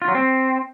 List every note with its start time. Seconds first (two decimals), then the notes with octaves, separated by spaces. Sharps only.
0.02 F4
0.08 F#3
0.15 C4